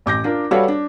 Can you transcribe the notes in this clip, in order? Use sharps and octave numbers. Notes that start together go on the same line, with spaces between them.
A1 D6 G6 A#6
D4 F4 A#4
G3 F#4 A4 B4 C#5 F5
D4